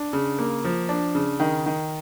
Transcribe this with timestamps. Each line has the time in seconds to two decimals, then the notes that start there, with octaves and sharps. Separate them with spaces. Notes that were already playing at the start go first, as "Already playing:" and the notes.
Already playing: D4
0.13 C#3
0.39 A#3
0.64 F3
0.89 D4
1.15 C#3
1.40 D#3
1.66 D#3